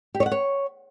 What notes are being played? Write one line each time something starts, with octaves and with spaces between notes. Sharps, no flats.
G4
C#5
F#5
C#5